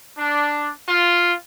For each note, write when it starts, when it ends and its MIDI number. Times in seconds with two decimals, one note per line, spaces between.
0.18 0.69 62
0.89 1.33 65